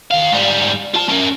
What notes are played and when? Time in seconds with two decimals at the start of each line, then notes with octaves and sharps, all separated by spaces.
0.11 D#3 F5
0.32 G#2 G3
0.95 F4 A5
1.09 C#4 A#4